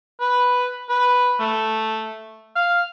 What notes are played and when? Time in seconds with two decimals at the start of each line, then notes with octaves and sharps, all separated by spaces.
0.20 B4
0.90 B4
1.40 A3
2.56 F5